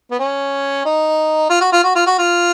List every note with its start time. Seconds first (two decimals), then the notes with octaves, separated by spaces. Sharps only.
0.11 B3
0.19 C#4
0.85 D#4
1.49 F4
1.61 F#4
1.72 F4
1.83 F#4
1.95 F4
2.06 F#4
2.18 F4